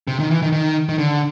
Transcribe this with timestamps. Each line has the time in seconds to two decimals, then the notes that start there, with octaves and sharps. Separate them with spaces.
0.08 C3
0.20 D#3
0.30 E3
0.42 D#3
0.52 D#3
0.89 D#3
0.98 D3